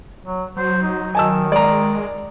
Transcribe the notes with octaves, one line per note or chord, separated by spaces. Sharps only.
F#3
F#3 C5
D#4
D#3 G#5 A5 E6
G#3 D5 A#5